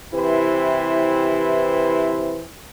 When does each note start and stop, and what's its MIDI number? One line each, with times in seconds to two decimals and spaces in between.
0.13 2.43 48
0.13 2.43 52
0.13 2.43 64
0.13 2.43 67
0.13 2.43 71
0.13 2.43 72